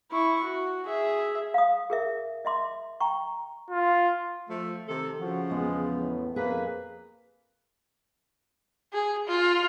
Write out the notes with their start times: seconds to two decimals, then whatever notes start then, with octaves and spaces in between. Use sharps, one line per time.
0.12 E4 C#6
0.43 F#4
0.86 G#4 E5
1.54 F5 D#6
1.90 G#4 A#4 E5
2.45 D#5 E5 C6 D6
3.00 G5 A#5 C#6
3.71 F4
4.50 F3 A3
4.88 C3 D#3 A4
5.20 C#3 F3 F#4
5.50 E2 G#3 B3
5.95 A2
6.36 F2 A#3 G#4 B4
8.93 G#4
9.28 F4